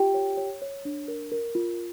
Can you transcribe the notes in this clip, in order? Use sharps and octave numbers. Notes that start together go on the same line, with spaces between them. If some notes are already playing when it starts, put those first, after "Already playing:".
Already playing: F4 G4 G5
C#5
C#5
C#5
D4
A#4
A#4
F4